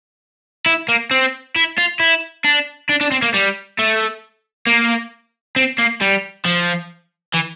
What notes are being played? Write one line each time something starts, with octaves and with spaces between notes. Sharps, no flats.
E4
A#3
C4
E4
F4
E4
D4
D4
D4
C4
A#3
G3
A3
A#3
C4
A#3
G3
F3
E3